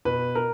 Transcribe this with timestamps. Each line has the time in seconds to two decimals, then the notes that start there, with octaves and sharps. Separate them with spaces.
0.05 B2 B4
0.35 A#4